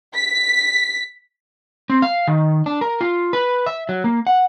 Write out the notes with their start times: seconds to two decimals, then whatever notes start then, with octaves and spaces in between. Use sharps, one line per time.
0.15 B6
1.90 C4
2.02 F5
2.27 D#3
2.66 D4
2.81 A#4
3.01 F4
3.33 B4
3.66 E5
3.89 F#3
4.04 A#3
4.27 F#5